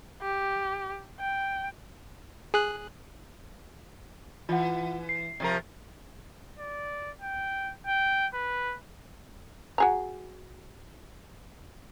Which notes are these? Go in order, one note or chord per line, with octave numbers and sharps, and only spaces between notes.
G4
G5
G#4 F#6
E3 F4 F#5
C7
C3 F3 A#4
D5
G5
G5
B4
F#4 G#4 A#5